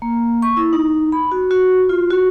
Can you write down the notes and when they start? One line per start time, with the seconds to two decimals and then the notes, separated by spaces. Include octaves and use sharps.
0.02 A#3
0.42 C#6
0.57 E4
0.73 D#4
1.12 B5
1.32 F#4
1.51 F#4
1.89 F4
2.11 F#4